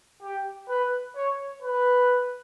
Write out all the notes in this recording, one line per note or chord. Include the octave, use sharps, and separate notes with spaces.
G4
B4
C#5
B4